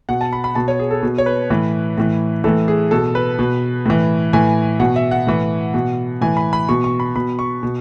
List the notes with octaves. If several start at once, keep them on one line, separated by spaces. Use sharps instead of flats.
B2 F#5
A5
B5
B5
B2 A5
C#5
G#4
A4
B2
C#5
B4
A2 E3
A2 E3
A2 E3 A4
G#4
B2 A4
B4
B2
A2 E3
A2 E3 G#5
B2 F#5
E5
F#5
A2 E3
B2
A2 E3 G#5
B5
B5
B2 C#6
C#6
B5
B2 B5
C#6
B2